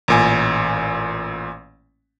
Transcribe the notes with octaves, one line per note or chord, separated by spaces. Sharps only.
A1 A#2 G#5